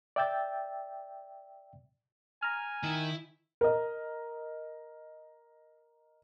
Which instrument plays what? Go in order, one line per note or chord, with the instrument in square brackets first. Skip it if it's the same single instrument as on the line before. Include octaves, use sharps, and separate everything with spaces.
[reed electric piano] D5 E5 G5 E6 G6 A6
[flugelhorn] G#5 [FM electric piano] A#5 F6
[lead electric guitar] D#3 [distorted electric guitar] E4
[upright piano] A#4 D#5